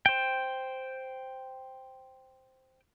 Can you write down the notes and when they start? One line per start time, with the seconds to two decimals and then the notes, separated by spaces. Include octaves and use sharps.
0.06 C5 G5